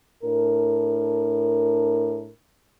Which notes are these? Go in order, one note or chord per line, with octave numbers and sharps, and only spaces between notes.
A2 D4 A#4